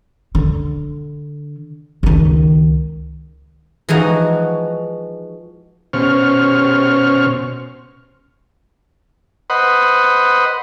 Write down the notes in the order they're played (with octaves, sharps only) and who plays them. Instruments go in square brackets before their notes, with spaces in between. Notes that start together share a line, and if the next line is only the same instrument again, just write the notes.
[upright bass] D3
C#2 D#3
[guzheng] E3 F3 G#3 D#4 F#4
[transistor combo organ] B2 C#4 C5 C#6 F6
B4 C5 D#5 F#5